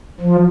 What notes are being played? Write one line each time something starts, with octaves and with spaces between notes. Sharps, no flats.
F3